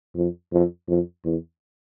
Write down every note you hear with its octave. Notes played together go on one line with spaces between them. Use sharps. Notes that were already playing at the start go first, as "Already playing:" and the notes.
F2
F2
F2
E2